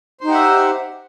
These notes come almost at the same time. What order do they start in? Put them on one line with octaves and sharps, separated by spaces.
C5 D#4 G4 F#5 E5